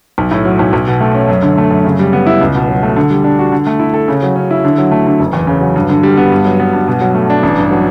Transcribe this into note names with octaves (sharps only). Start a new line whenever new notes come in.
B1
A2
F#3
B1
B1
B2
A3
C#4
F#2
D3
A3
F#2
C#3
G3
B3
E4
C#2
B2
F#3
A3
D3
G3
D4
F#4
D3
A3
E4
A4
C#3
F#3
C#4
E4
D3
F#3
A3
D3
F#1
E2
C#3
F#3
G2
D3
G3
B3
G2
F#3
B3
G2
B2
F#3
A3
D4
A1
G2
F#3